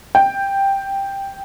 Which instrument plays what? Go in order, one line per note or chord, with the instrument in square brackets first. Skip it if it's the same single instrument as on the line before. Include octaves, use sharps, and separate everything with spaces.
[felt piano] G5